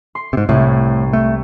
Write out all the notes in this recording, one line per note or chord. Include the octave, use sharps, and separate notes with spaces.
C6
G#2 C3
C2 A2
A3